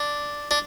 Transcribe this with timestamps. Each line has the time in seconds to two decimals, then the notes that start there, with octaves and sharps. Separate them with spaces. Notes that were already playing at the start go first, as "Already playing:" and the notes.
Already playing: D4
0.51 D4